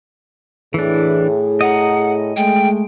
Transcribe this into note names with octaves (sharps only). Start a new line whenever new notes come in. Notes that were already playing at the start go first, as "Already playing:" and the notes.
A2 E3 D4 G#4
D#5 F#5 A#5
G#3 A3 G5